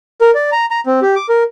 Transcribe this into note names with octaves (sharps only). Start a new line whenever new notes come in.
A#4
D5
A#5
A#5
C4
G4
D6
A#4